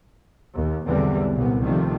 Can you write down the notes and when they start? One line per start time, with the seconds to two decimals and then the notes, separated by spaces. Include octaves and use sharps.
0.54 D#2
0.87 B1 E2 D3 E3 G3 C4
1.35 C2 A#2 B3
1.63 C3 D#3 F3 G3 A3